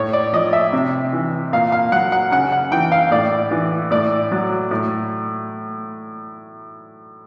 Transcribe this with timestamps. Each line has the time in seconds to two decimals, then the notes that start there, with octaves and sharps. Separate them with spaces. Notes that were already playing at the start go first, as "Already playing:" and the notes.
Already playing: A2 C#5
0.13 D5
0.33 F3 D#5
0.53 E5
0.73 C3
1.13 E3
1.53 A#2 F5
1.72 F5
1.92 F#3 F#5
2.12 F#5
2.32 C#3 F#5
2.52 F#5
2.72 E3 G5
2.92 F5
3.11 A2 D5
3.51 E3
3.91 A2 D5
4.31 F#3
4.71 A2